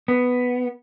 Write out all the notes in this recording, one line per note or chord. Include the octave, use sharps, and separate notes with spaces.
B3